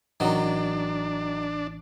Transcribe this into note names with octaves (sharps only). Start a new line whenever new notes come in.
A1 D#3 F#3 D4